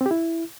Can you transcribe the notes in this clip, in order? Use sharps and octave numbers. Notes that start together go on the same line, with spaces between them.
C4
G4
E4